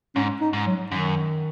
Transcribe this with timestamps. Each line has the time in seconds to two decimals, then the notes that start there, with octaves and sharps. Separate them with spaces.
0.16 G#2 C#4
0.41 D#4
0.53 G#2
0.66 F#3
0.92 F#2 D#3